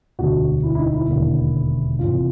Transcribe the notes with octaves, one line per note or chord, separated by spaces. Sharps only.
E1 D2 D3 F#4
E4
E4
D#4
E4
E1 D#2 D3
F#1 F2 C3 E3 F4